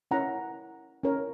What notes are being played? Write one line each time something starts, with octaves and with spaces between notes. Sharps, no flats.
C#4 E4 A#4 C#5 F#5 A#5
C#4 E4 A#4 C#5